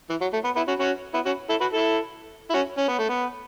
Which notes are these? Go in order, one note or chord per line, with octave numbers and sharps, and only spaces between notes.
E3
F#3
A3
B3
B3 E4
C#4 F#4
C#4 F#4
B3 E4
C#4 F#4
E4 A4
F#4 B4
E4 A4
E4
C#4 F#4
C#4
B3
A3
B3